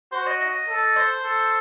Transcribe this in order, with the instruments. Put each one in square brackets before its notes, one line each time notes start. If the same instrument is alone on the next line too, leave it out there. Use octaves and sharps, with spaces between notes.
[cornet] F#4 [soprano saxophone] C5
[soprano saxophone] D#5
D#5
[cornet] A4
[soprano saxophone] C5
[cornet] A4